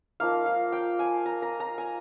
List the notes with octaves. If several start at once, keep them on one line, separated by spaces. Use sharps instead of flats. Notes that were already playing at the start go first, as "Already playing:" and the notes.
F3 A#3 D#4 F5
F5
G5
G#5
A#5
A#5
A#5
G#5